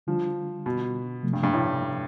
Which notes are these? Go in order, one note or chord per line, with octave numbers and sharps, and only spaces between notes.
D3 F3 G3 D4 F4
B2
C3 F3 A3
G2
G2
A2